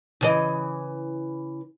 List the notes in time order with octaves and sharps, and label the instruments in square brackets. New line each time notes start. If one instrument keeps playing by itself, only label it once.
[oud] C#3 E3 D#5